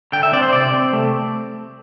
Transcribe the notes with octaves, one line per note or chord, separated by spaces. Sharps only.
D3 G5
E5
C4 D5
C5
C3 D5
C4
A3